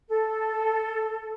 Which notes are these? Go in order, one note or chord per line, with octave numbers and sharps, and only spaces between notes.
A4